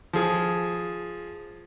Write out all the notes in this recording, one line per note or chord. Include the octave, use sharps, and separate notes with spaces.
F3 G#4